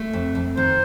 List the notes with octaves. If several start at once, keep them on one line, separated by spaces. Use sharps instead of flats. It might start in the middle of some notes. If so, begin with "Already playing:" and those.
Already playing: A3
F2
F2
D#3 C5